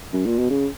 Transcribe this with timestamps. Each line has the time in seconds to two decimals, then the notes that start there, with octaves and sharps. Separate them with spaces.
0.13 F#2
0.26 A#2
0.39 B2
0.50 C#3